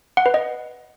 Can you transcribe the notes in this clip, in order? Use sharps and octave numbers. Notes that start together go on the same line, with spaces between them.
F#5
B4
D#5